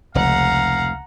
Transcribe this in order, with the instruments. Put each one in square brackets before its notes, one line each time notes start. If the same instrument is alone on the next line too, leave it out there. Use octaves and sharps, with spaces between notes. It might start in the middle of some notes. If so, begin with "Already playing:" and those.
[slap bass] F1 [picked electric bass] C#2 [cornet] F5 [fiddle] F#5 A#5